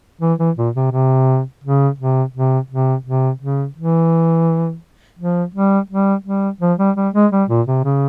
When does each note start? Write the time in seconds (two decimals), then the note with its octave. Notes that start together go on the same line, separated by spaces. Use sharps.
0.21 E3
0.39 E3
0.57 A#2
0.75 C3
0.92 C3
1.64 C#3
1.99 C3
2.34 C3
2.71 C3
3.06 C3
3.41 C#3
3.77 E3
5.19 F3
5.54 G3
5.90 G3
6.24 G3
6.61 F3
6.79 G3
6.96 G3
7.14 G#3
7.32 G3
7.49 A#2
7.67 C3
7.84 C#3